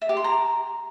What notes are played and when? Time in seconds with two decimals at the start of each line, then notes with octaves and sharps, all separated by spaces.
0.02 E5
0.09 G4
0.17 C6
0.24 A#5